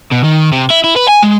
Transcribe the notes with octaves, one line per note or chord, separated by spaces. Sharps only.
B2
D#3
C3
E4
E4
B4
G#5
G#3